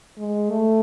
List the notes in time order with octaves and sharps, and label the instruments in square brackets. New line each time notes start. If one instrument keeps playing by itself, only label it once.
[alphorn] G#3
A3